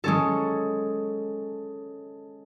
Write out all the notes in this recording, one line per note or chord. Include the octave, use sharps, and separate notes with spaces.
G#3 C#4 A4